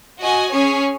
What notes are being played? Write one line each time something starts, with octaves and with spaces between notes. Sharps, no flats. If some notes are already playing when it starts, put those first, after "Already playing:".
F#4 D#5 G#5
C#4 G#4 C#5 G#5